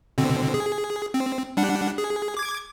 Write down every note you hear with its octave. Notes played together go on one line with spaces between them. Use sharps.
B2 D3 C4
G#4
C4
G3 D4 F#5
G#4
D6 G#6